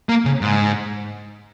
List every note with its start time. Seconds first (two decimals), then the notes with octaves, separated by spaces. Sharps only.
0.09 A#3
0.25 C#3
0.41 G#2